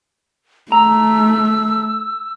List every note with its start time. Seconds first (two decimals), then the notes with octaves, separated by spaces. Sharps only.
0.72 A3 A#5 E6